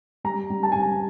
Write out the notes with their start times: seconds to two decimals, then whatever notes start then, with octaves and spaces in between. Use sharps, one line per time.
0.24 G3 A#5
0.50 G3
0.63 A5
0.72 G3 G#5
0.81 A5